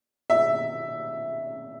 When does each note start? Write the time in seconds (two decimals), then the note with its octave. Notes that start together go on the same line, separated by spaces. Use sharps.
0.30 E5